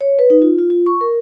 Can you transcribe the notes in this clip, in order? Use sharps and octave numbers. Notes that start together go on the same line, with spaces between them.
C#5
B4
D#4
F4
F4
F4
C#6
A#4